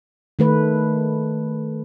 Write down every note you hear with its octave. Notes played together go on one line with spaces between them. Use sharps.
D#3 A3 B4